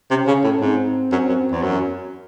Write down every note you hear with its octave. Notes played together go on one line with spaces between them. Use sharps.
C3 C#4
C#3
A2
G#2 C4
F#2
F#2
E2
F#2